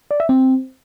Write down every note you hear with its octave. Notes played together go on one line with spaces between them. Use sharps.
D5
E5
C4